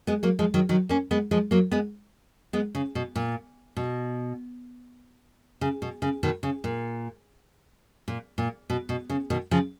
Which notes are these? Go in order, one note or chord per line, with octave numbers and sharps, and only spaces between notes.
G#3 B3
F#3 A#3
F3 G#3
D#3 F#3
D#3 F#3
A#3 C#4
G#3 B3
F3 G#3
F#3 A#3
G#3 B3
G#3 B3
C#3
B2
A#2
B2
C#3
B2
C#3
B2 D#3
C#3
A#2
A#2
A#2
B2
B2
C#3
B2 D#3
C#3 F3